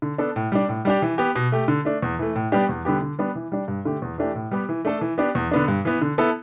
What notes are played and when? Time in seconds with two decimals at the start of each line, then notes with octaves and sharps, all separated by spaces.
0.02 D3
0.18 B3 D4 A4
0.36 A2
0.52 G3 D4
0.69 A2
0.85 G3 D4 G4
1.02 E3
1.18 B3 G4
1.36 B2
1.52 A3 G4
1.68 D3
1.85 A3 D4
2.02 E2
2.19 E3 A3
2.36 A2
2.52 G3 B3 D4 G4
2.69 E2
2.85 D3 G3 B3 G4
3.02 D3
3.19 G3 B3 D4
3.35 E3
3.52 G3 D4
3.68 G2
3.85 D3 A3 G4
4.02 E2
4.18 E3 A3 D4 G4
4.35 A2
4.51 G3 B3 G4
4.69 E3
4.85 A3 D4 A4
5.01 E3
5.18 B3 D4 G4
5.35 E2
5.51 D3 B3 D4
5.68 G2
5.85 E3 B3
6.02 D3
6.18 B3 E4 A4